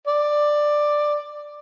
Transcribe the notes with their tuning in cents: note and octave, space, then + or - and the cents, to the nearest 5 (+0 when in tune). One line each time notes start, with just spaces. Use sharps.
D5 +10